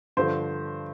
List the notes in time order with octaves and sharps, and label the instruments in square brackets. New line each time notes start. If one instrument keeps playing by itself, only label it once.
[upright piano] G2 D3 F3 C5